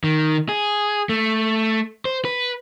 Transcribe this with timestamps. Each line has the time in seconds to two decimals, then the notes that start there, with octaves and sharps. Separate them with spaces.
0.04 D#3
0.49 G#4
1.09 A3
2.05 C5
2.25 B4